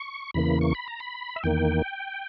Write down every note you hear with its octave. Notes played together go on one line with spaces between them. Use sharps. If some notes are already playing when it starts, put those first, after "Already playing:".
Already playing: C#6
E2 C#3 E3 A#3 B5
C#6
B5
A#5
B5
E5
E2 D#3 A#3 G5